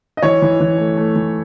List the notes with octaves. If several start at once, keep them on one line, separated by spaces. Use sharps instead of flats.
D#5
E3 C#5
E3
E3
A3
A3
E3